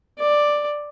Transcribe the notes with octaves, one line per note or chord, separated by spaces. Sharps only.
D5